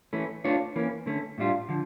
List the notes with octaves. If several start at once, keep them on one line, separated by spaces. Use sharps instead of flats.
E3 A3 C#4
A3 D4 F4 C#5
E3 A#3 C#4
D3 A3 C#4
A2 G3 D4 F4
D3 F3